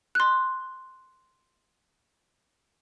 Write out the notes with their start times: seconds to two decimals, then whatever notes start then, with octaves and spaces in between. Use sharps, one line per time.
0.15 C6 F#6